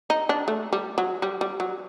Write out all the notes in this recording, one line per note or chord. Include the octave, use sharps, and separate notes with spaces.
D#4
D4
A3
G3
F#3
G3
G3
F#3